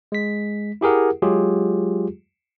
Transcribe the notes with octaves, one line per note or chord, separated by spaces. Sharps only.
G#3 B6
E4 G4 G#4 A#4 F#5
F#3 G#3 F4 G4 G#4